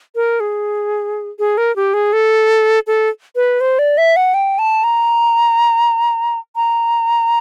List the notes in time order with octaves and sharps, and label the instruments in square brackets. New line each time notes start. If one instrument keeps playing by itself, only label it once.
[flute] A#4
G#4
G#4
A#4
G4
G#4
A4
A4
B4
C5
D5
E5
F#5
G5
A5
A#5
A#5